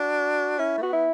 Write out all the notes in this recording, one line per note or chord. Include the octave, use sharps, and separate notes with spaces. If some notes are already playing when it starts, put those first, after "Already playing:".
Already playing: D4 F#4
C#4 E4
A3
B3 F#4
E4